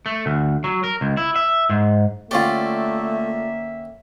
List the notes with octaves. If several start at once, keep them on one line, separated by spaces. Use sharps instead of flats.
A3
D2
F#3
A#4
C#2
E4
E5
G#2
D3 A3 A#3 C#4 F4 G4 D5 E5